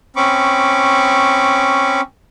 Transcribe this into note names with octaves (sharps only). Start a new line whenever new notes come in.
C4 C#4 B5 C#6 D6